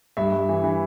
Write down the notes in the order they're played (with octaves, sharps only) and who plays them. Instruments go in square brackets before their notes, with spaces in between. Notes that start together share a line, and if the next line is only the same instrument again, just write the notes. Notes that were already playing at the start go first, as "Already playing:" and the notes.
[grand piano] G2 E5
G2
E3
E3